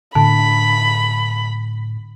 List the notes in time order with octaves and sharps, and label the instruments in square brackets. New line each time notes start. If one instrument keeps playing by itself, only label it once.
[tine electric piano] A2 [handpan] D3 [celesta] A5 [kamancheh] B5